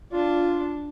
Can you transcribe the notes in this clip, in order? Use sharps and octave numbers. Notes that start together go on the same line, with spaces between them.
D4 F4